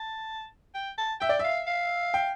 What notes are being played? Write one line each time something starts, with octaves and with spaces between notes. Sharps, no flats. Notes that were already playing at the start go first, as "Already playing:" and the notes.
Already playing: A5
G5
A5
E5 G5
D5
E5 F5
F5
G5